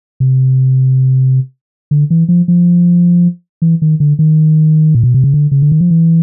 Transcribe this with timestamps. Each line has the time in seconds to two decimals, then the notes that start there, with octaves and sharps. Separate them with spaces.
0.20 C3
1.91 D3
2.10 E3
2.29 F3
2.48 F3
3.62 E3
3.82 D#3
4.00 D3
4.19 D#3
4.94 A#2
5.03 B2
5.14 C3
5.24 C#3
5.34 D3
5.51 C#3
5.62 D3
5.72 D#3
5.81 F3
5.90 E3